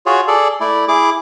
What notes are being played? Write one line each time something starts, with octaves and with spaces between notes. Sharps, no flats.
F4 F#4 G#4 C#5
G#4 A4 D5
A3 E4 D5
E4 G#4 D6